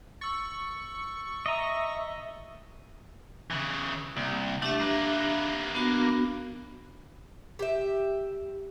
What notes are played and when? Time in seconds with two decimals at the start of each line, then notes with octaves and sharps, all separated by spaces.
0.21 C#6 E6 A6
1.46 D#5 E5 A#5 D6 A6 D#7
3.51 C#3 E3
4.17 C2 A#3
4.62 A3 D4 G4 E5
4.80 A#3 B4
5.75 B3 D4 F#4
7.59 G4 E5